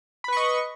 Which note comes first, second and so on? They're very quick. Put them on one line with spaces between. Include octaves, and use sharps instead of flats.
B5 B4 C#6 D#5